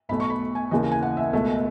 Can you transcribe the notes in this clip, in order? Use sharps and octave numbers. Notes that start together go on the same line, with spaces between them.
B1 B2 A3 B5
C#6
B5
G#5
D#2 C#3 E3 D#5
G#5
F#5
E5
C#2 B2 A3